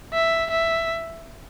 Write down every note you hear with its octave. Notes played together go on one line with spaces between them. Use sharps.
E5
E5